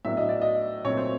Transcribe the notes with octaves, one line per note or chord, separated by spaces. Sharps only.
A2 F#3 B3 D4 E5
D#5
D5
D#5
A#2 F#3 A3 C4 C#5
C5